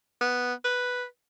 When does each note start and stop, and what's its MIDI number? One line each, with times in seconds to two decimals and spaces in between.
0.21 0.53 59
0.65 1.05 71